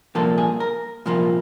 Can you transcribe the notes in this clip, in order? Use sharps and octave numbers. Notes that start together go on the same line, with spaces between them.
C2 A#2 F3 A#3 A4
G#4
A#4
C2 A#2 F3 A#3